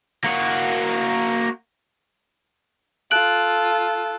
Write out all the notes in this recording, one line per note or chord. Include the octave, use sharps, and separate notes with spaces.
A#3 F#4
F4 A4 F#6 D7 F#7